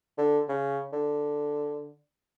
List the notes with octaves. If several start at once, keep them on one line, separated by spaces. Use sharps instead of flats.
D3
C#3
D3